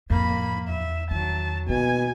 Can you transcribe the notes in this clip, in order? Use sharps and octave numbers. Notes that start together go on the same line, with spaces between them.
F2 A2 A#3 B5
E2 E5
D#3 F#3 A5
B2 A#3 G#5